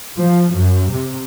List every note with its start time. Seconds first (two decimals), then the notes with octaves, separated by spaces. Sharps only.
0.18 F3
0.54 F#2
0.92 C3